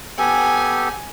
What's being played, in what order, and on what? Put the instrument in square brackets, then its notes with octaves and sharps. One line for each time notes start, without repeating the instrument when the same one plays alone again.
[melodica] B3 G4 A4 [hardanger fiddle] G#5